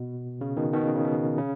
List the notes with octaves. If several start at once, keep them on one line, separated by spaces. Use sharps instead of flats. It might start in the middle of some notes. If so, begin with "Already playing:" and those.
Already playing: B2
C#3
B2 D#3
B2 D#3
C#3
C#3
B2
C#3